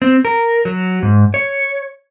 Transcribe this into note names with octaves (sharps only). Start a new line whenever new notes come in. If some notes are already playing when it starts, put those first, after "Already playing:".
C4
A#4
F#3
G#2
C#5